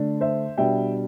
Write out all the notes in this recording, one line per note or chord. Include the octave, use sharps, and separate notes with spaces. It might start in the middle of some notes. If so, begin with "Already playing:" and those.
Already playing: D3 A3 D4
C5 E5
B2 G3 D4 E5 G5